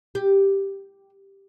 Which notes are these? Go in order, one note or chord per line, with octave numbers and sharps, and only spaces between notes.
G4